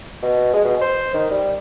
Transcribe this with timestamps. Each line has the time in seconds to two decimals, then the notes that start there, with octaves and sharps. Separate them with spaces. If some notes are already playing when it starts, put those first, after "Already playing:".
0.23 B2
0.53 G#3
0.65 B2
0.81 C5
1.14 D#3
1.30 G3